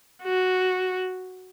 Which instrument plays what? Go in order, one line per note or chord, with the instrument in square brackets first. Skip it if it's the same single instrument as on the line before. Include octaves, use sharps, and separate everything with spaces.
[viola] F#4